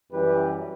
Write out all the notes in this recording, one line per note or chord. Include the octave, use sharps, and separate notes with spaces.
F#2 E3 G3 G4 B4